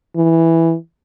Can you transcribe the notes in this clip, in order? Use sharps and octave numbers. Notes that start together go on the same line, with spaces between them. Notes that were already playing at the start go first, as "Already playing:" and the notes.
E3